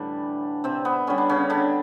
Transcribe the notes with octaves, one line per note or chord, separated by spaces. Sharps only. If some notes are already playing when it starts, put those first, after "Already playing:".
Already playing: A2 D3 E3 G3 D4
C3 C4
B3
D3 G3 C#4
D4
C#3 C#4
D3 D4